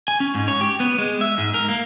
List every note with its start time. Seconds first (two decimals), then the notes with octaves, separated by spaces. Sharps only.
0.08 G#5
0.20 C#4
0.35 G#2
0.48 C#5
0.61 G4
0.80 B3
0.98 G#3
1.21 E5
1.38 G#2
1.54 A#4
1.69 A#3